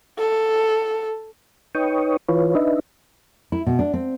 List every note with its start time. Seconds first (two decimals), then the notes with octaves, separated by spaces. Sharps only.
0.18 A4
1.75 D#4 B4 C#5 G5 C#6 D#6
2.29 E3 F4 B4 C#5
2.55 D4 D#4 B4 D#5 E5
3.52 E4
3.67 B2
3.79 D4
3.94 C4